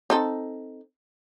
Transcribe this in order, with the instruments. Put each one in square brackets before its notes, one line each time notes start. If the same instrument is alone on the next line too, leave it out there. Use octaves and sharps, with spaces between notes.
[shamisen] C4 D#4 A4